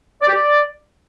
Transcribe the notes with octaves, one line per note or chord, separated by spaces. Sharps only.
D5
G4
D5